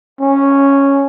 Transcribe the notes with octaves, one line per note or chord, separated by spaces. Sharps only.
C#4